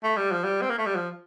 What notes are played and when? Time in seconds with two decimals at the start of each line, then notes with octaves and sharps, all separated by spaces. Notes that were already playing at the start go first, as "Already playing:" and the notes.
0.03 A3
0.17 G3
0.31 F3
0.44 G3
0.61 C4
0.70 A#3
0.78 A3
0.86 G3
0.95 F3